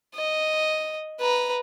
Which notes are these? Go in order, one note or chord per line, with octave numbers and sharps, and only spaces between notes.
D#5
B4 A#5